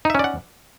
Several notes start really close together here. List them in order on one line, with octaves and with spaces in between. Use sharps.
D#4 E5 C#4 D5 F#5